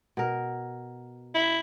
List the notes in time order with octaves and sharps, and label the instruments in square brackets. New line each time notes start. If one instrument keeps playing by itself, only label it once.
[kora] B2 A#4
[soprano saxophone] E4